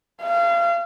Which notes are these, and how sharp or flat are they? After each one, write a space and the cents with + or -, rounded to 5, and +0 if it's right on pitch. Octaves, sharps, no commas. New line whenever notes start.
F5 -30